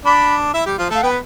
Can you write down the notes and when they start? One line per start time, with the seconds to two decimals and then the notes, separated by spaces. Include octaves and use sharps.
0.05 D4 D5 B5
0.54 E4 E5
0.66 G3 G4
0.78 F3 F4
0.90 A3 A4 F5
1.03 B3 B4 G5